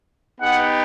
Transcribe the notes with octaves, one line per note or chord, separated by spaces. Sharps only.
B3 D#4 G4 F#5